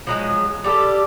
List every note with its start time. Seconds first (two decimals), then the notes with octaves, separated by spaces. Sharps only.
0.07 F3 F#3 G#3
0.64 G3 G4 A4